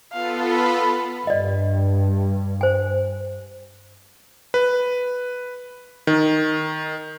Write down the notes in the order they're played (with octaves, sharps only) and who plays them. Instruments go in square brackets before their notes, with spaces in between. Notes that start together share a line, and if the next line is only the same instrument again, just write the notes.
[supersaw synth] B3 F4 A4 [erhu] F5
[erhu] B5
[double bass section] G2 [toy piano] D5 D#5
[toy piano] C5 G#5
[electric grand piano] B4
D#3